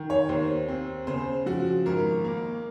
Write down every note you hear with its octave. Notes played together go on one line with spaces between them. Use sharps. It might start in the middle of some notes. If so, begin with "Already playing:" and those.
Already playing: D#3
C#5
D#2 C5
C4
C#3 C5
F3 F#4
G#1 A#4
A#3